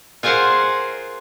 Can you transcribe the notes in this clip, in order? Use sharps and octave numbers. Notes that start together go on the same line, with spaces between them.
F4 G#4 A#4 C5 F5 F#5